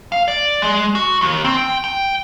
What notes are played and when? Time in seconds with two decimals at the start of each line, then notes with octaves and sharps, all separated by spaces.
0.12 F5
0.28 D5
0.62 G#3
0.95 F#4
1.21 D#2
1.45 C4
1.57 G5
1.84 G5